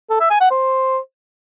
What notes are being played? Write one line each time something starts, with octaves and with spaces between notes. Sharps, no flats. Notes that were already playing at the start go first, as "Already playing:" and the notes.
A4
E5
G#5
F#5
C5